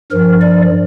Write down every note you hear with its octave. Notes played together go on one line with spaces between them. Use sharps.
G2 F3 A#4
D5